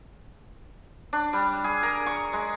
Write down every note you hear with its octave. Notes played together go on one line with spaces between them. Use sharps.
D4
G3
G#4
A#4
C#6
G#3